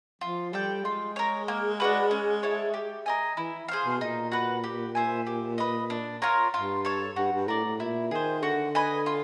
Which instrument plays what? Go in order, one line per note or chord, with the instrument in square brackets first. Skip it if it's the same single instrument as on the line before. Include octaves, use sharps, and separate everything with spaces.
[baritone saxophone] F3 [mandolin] F4
[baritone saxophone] G3 [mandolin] A4 D5 G5
[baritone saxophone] G#3 [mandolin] F4
[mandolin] A#4 C#5
A#3
D4 F#4 B4
C#4
E4 A4 C#5
G4
A#4 D#5 G#5
[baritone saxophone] E3 [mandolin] E4
[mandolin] G#4 C5 F5
[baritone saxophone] B2
[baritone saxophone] A#2 [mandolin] D#4
[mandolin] F#4 B4
G4
C5 E5 G#5
G4
B4 D#5
D4
F4 A#4 C#5
[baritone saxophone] G2 [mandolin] F4
[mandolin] A4 C#5
[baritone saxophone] G2 [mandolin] F#4
[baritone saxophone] G2
[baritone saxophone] A2 [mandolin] A#4 D5
[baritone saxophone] A2
[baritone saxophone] A#2 [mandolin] E4
[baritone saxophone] D#3 [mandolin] G#4 C5
[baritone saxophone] D3 [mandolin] F#4
[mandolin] B4 D#5 G#5
F4